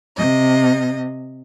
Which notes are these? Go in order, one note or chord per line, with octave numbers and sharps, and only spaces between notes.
C3 D#5